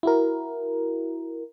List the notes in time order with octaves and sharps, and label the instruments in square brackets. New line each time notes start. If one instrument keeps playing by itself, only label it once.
[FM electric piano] E4 F#4 A#4